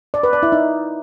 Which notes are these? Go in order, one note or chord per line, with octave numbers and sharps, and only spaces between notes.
D5
B4
D5
E4
D#4